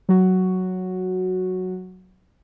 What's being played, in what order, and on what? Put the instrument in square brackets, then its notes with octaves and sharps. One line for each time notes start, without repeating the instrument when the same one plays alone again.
[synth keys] F#3 F#4